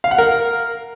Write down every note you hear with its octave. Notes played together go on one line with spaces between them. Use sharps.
F5
F#5
A#4